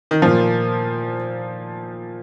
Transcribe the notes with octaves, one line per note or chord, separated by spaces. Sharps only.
D#3
A#2 F3 A#3 F4